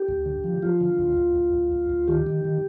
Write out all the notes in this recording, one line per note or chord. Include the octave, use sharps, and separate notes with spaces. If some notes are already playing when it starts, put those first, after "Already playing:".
Already playing: G4
D2
D3
F3
F3 F4
D3
D2
D2
D2
D2
D2
D2
D#3 G4
D#3
D#3